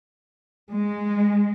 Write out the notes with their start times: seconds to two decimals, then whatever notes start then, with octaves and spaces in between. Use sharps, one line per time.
0.71 G#3